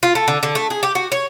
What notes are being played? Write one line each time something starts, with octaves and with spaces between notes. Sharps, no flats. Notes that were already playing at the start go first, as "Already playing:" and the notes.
F4
A3
D3
D3
A3
G#4
G4
F#4
C#5